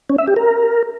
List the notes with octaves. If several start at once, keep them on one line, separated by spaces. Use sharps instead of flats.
C#4
E5
G4
A#4